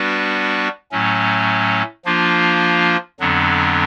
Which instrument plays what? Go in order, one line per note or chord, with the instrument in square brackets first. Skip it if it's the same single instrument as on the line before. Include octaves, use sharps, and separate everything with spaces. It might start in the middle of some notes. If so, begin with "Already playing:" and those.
Already playing: [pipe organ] G3 B3 D4 F#4 B4
A2 F#3 A3 C#4
F3 A#3 D4 F4
F2 D3 F#3 B3 D4